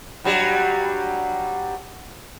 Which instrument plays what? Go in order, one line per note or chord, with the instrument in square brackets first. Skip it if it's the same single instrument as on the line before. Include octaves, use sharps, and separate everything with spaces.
[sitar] G2 F#3 G3